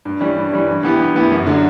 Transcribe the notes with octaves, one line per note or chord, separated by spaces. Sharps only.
G2
E3 G3 C#4
G2
E3 G3 C#4
G2
E3 B3 E4 G4
G2
E3 B3 E4 G4
F#2
D3 F#3